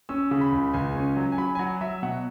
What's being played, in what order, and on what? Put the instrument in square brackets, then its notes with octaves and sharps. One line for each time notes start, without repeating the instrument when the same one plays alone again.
[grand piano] C#4 E6
C#3
B5
C#2
C#2 G#5
C#4
F#3
G#5
F#3 B5
G#5
F#3 F#5
F#3 E5
B2 F#5